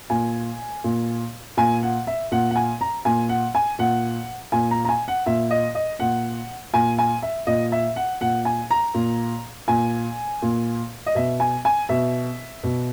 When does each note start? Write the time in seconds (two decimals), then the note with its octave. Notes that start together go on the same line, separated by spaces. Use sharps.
0.10 A#2 G#5
0.84 A#2
1.57 A#2 G#5
1.83 F#5
2.07 E5
2.31 A#2 F#5
2.51 F#5
2.56 G#5
2.81 A#5
3.05 A#2 G#5
3.29 F#5
3.55 G#5
3.79 A#2 F#5
4.52 A#2 G#5
4.71 A#5
4.85 A#5
4.89 G#5
5.08 F#5
5.26 A#2 E5
5.51 D#5
5.75 D#5
5.99 A#2 F#5
6.74 A#2 G#5
6.98 G#5
7.22 E5
7.47 A#2 D#5
7.72 E5
7.96 F#5
8.21 A#2 F#5
8.45 G#5
8.71 A#5
8.94 A#2
9.68 A#2 G#5
10.42 A#2
11.06 D#5
11.15 B2 E5
11.40 G#5
11.65 G#5
11.89 B2 E5
12.63 B2